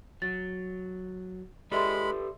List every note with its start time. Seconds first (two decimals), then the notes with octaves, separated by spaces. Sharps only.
0.22 F#3 A6
1.72 G#3 G4 A4 B4 D5 E5 B5 C6